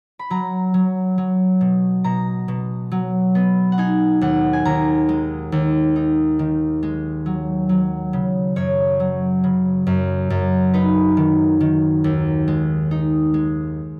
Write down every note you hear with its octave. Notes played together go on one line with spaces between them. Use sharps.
B5
F#3 A#5
F#3
F#3
B2
B2 A#5
B2
F#3
B3
F#5
D#4 G#5
D#2 F#5
G#5
D#2 A#5
G#3
D#2
D#4
D#3
G#3
F#3
F#3
C#3
F#2 C#5
F#3
C#3
F#2
F#2
D#4 B4
D#3
D#3
D#2
G#3
D#4
G#3